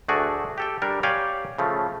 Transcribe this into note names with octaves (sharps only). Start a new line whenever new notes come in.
D2 A3 F#4 G#4 D5
G4 A4 G5
G3 D4 A#4
G4 C#5 D5 F5 G5 G#5
C#3 F3 A3